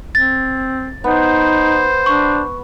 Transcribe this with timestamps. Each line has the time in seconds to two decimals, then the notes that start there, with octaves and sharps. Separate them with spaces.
0.15 C4 A6
1.04 B3 D#4 C5
2.06 D4 C#6